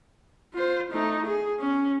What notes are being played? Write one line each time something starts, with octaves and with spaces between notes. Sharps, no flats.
F4 C5
A3 D#4
G#4
C#4